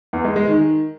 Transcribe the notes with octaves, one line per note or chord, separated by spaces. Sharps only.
E2
G#3
G#3
D#3